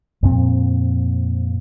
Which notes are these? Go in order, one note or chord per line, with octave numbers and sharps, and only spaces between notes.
F2 A#2 C4